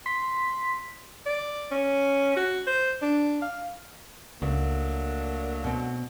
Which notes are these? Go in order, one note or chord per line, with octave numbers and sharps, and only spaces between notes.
C6 B6
D5
C#4
F#4
C5
D4
F5
C#2 F#3 A3 A#3 D4
B2 C4